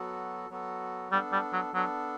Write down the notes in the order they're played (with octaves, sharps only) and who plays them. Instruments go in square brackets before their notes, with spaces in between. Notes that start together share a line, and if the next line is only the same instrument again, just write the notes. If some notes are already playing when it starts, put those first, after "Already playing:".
Already playing: [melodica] F#3 B3 F#4 A4
F#3 B3 F#4 A4
[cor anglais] G3 [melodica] B3 D4 A4
[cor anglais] G3
F#3
[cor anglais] F#3 [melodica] B3 D4 A4